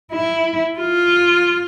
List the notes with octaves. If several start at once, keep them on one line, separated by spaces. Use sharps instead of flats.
E4
F4